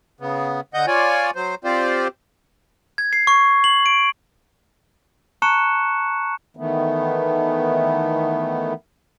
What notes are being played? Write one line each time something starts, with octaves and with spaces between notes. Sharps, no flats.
C#3 B3
D3 D#5 F#5 G6
F4 C#5 D5 G#5
F#3 C5
C4 F4 G4 C5 D5
G#6
C7
C#6
F#7
D7
A5 A#5 C#6 F#6 C#7 E7
D#3 E3 A3 B3